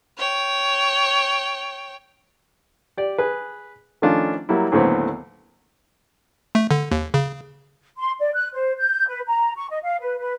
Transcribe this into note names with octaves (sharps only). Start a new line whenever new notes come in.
C#5 G5
G4 D5
G#4 B4
D#3 F3 A3 C#4 D4 F4
F#3 G3 A#3 E4
D#2 A2 D3 F#3 B3 C4
A3
D3
D#2
C#3
C6
D5
F#6
C5
G6
B4
A#5
C#6
D#5
F5
B4
B4